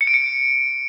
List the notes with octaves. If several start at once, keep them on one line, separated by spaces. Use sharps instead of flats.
C#7
D7
C#7